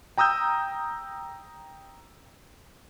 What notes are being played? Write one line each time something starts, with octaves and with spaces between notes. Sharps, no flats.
G5 A#5 D#6 E6 G6